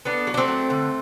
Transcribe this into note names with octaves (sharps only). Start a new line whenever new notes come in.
A3 B3 D4
F#3
D4
A3 C4
F#3
D3